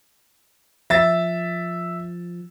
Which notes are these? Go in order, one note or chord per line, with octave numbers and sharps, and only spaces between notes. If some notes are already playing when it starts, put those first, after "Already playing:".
F3 E5 A6